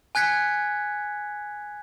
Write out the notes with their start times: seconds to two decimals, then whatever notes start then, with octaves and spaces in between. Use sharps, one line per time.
0.15 G#5 F#6 G#6 B6 C#7